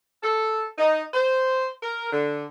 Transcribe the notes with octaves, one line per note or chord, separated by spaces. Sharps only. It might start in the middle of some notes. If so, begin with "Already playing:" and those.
A4
D#4
C5
A#4
D3